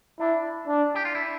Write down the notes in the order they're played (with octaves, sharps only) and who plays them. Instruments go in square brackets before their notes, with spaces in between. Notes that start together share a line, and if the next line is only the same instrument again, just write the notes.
[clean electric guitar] D4 [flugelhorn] E4
[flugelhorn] D4
[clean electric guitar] G4
F4
E4